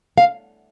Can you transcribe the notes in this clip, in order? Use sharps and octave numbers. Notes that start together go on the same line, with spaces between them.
F5